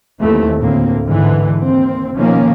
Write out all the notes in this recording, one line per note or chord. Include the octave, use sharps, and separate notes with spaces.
D#2 E3 A3 C4
D2 A2 A#3 C4
G#2 D3 E3
D#2 C4
B2 D#3 F3 A#3 C#4